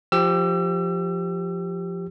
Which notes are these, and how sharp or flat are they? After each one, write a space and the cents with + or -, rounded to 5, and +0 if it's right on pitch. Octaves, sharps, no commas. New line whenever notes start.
F3 +0 G4 +0 E6 +35